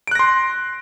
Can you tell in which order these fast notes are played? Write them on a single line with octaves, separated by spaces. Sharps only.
D7 F#6 A#6 C6